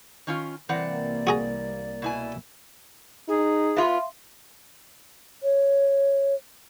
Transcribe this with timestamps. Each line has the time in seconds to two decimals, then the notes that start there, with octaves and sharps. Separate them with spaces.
0.27 D#3 C#4 F4
0.69 C2 E3 A#3 C4 D5 F#5
1.27 F#4 G#4 A#5
2.02 B2 E4 G#5
3.29 D#4 G#4
3.77 B3 F4 E5 F5 C6
5.43 C#5